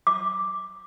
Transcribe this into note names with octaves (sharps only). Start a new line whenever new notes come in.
D6